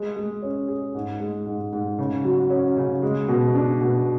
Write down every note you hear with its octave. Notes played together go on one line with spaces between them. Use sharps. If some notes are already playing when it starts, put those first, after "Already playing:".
Already playing: G#3
G#3
C#4
G#4
G#2
G#3
G#2
G#2
C#3
F#3
C#4
C#3
G#3
B2
D4
B2